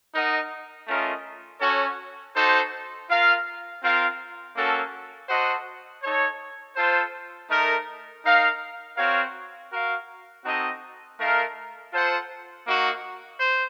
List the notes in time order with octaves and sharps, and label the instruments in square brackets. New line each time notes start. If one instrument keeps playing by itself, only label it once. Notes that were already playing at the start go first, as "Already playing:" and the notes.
[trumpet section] D#4 A#4 D#5 F#5
A3 C#4 F4 A#4 D#5
C#4 F#4 A4 C#5
D#4 F#4 A4 C5
F4 A#4 F5
C4 F4 A#4 F5
A#3 C#4 F#4 A4
F#4 A4 C5 D#5 F#5
D#4 A4 C#5
F4 A4 C5
A3 D#4 A#4
D#4 A#4 F5
C4 F#4 A#4 C#5 F5
F#4 A#4 F5
C4 D#4 F#4 A4 D#5
A3 D#4 A#4 F5
F4 A4 C5 F#5
A#3 D#4 F#4
C5